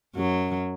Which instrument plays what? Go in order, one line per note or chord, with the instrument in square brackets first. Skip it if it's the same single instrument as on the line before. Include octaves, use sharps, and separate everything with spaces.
[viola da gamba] F#2 F#3